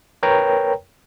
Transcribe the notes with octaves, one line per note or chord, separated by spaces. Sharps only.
A#4 B4 C#5 G5 A#5